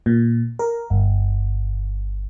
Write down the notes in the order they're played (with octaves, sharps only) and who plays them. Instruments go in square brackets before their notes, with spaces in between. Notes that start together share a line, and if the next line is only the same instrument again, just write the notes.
[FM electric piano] A#2
A#4
G1